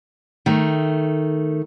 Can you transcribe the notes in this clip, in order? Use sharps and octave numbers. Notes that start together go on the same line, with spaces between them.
D#3 A3